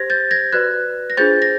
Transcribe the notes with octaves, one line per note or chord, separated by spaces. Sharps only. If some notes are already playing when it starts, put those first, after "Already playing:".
Already playing: G4 C5 G#6 A#6
G6 A6
G#6 A#6
F#4 B4 D5 F#6 G#6
A#6
D4 F4 G#4 C5 G6 A6
A#6